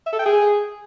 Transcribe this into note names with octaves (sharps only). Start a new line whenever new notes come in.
E5
A4
G5
G#4